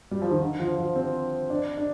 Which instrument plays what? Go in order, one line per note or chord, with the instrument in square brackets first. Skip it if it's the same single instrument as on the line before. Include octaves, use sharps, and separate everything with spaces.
[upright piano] G3
F3
D#3
D3
F3
F3
C4
D4
D4